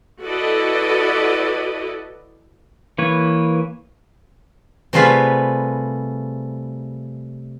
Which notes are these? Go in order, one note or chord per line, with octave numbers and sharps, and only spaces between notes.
E4 F#4 A4 B4 D5 D#5
E3 A#3 B4 C#5
C3 G3 A3 F4 G#4 B4